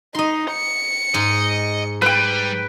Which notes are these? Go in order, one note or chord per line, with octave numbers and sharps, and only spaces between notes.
D#4 D#5 C6
C#7
G#2 D#5
G3 B4 G5